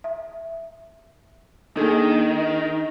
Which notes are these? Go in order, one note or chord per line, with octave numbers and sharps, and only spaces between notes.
E5
D#3 A#3 D4 G#4 A4